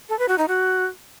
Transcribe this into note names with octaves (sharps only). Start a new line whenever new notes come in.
A4
B4
F#4
D#4
F#4